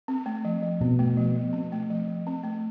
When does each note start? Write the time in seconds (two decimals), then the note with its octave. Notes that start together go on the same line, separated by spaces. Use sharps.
0.08 C4
0.26 A3
0.45 F3
0.63 F3
0.81 B2 C4
0.99 A3
1.17 F3
1.35 F3
1.53 C4
1.72 A3
1.90 F3
2.08 F3
2.27 C4
2.44 A3